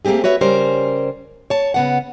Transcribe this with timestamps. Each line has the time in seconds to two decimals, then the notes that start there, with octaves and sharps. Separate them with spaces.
0.05 A3 A#3 C4 G4 G#4
0.24 F#4 B4 C#5 E5
0.41 C#3 G3 C#4 A#4 C5
1.50 C#5 A5
1.74 C#3 B3 F#5